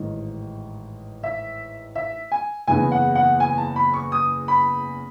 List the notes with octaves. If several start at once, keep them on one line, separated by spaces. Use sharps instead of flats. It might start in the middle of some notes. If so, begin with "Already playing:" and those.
Already playing: A1 G#2 D#3
E5
E5
G#5
F#1 E2 C#3 E3 G#5
F#5
F#5
G#5
A5
B5
C#6
D#6
B5